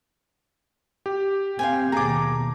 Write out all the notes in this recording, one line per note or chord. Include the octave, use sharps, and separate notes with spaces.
G4
C4 F5 G5 G#5
D#2 B2 A#3 G#4 A5 A#5 D6